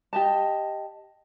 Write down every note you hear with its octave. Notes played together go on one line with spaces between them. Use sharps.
G4 D#5 A5